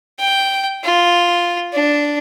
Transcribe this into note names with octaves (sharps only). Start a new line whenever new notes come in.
G5
F4
D4